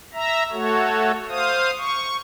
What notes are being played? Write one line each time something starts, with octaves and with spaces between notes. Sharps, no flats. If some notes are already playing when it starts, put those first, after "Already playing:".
E5 A#5
A3 F#4 A4 C#5
C5 F5 D#6
C#6